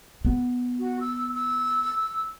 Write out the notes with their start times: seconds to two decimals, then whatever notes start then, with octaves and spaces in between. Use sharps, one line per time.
0.25 B3
0.79 F#4
1.00 E6
1.34 E6